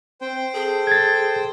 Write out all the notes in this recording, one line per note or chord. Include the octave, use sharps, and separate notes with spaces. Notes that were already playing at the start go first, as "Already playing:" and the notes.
C4 C5 G5
G#4 A4
G#6 A6